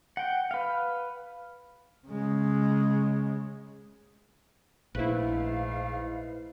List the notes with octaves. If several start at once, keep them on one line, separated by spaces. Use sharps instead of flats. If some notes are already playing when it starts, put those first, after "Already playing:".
F#5 G5
B4 F5
C#3 G#3
A#1 G#2 A3 E4 B4 F5